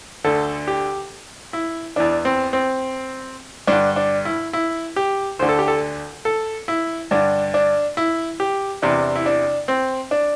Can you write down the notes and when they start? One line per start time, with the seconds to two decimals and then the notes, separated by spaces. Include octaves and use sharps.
0.24 D2 D3 A4
0.68 G4
1.53 E4
1.96 E2 E3 D4
2.25 C4
2.53 C4
3.67 G2 D3 D4
3.96 D4
4.25 E4
4.53 E4
4.96 G4
5.39 D2 D3 C5
5.49 A4
5.59 G4
5.68 A4
6.25 A4
6.68 E4
7.11 G2 D3 D4
7.54 D4
7.97 E4
8.40 G4
8.82 E2 C3 E3 D4
9.16 E4
9.26 D4
9.68 C4
10.11 D4